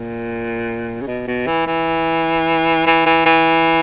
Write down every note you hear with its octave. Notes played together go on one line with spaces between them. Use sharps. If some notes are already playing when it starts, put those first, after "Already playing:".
Already playing: A#2
C#3
B2
B2
E3
E3
E3
E3
E3